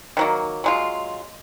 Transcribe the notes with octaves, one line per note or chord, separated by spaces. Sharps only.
D#3 F#3 A#3
F#3 G#3 F4